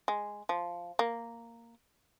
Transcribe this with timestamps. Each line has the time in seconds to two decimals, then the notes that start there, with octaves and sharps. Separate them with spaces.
0.08 G#3
0.49 F3
0.99 A#3